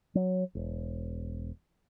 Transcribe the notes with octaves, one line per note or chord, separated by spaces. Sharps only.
F#3
E1